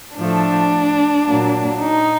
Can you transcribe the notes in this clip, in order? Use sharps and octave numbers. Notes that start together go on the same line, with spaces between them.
A2 F3 A3 D4
A#2 F#3 A#3
D#4